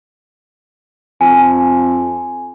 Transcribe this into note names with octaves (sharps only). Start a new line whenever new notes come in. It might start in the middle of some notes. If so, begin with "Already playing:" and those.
F2 G#5